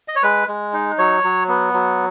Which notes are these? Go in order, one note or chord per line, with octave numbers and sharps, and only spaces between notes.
D#5
C#5
G#3 B4
G#3
D#4
F#3 C#5
F#3
B3
F#3